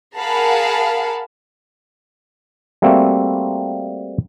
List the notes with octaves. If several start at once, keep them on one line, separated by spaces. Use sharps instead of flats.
G#4 A#4 F5 F#5 A5 B5
G3 A3 A#3 C4 F#4 E5